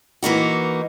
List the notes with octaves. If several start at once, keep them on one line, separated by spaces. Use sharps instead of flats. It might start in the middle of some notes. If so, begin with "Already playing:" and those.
E3 A#3 D#4 F#4